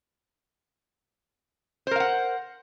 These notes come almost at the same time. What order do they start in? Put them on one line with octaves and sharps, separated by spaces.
C5 A#4 F5 F#5